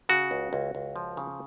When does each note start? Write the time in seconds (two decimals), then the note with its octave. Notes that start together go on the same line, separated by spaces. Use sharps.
0.09 C#3 F#4
0.31 C#2
0.53 C#2
0.75 C#2
0.96 F3
1.17 C#3